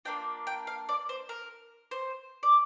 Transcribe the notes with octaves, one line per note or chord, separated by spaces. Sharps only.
A#3 D4 F4 G5
G5
F5
D5
C5
A#4
C5
D5